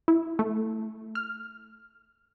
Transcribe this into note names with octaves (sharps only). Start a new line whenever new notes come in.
E4
A3
F6